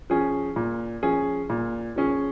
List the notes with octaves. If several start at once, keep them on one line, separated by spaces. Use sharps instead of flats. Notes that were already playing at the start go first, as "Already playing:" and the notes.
F3 C#4 G#4
A#2
F3 C#4 G#4
A#2
F3 C#4 G#4